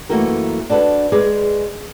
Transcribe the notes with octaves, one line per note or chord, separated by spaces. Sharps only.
F#2 E3 A3 A#3 F#4 A#4
D4 F#4 A4 B4
G#3 G#4 B4 D5